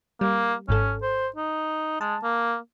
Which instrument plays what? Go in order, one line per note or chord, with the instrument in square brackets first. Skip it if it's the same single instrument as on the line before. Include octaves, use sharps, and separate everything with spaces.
[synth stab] G3 [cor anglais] A#3
[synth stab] G#1 G#2 A4 [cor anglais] C#4
[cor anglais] C5
D#4
[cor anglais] G#3 [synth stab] A5
[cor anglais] A#3